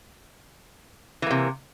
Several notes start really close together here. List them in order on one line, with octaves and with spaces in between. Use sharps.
E3 A#3 C3